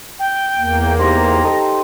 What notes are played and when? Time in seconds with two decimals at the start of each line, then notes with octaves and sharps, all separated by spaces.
0.19 G5
0.57 E2 A#3
0.99 D#4 G4 C5 A#5
1.43 A4 D#5